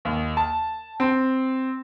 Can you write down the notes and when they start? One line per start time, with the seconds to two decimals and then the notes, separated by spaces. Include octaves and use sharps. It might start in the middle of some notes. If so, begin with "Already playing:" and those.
0.05 D#2
0.37 A5
1.00 C4